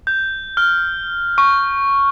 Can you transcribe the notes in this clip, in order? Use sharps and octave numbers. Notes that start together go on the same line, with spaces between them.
G6
F6
C#6